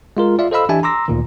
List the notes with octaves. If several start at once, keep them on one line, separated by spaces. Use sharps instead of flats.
G#3 F4 A#4
F4 D5 E5 F5
A4 C5 D#5 F5 B5 E6
E3 D4 G4 E5 G#5 A5
A#5 C6 D6 E6 A#6
D2 A#2 D#3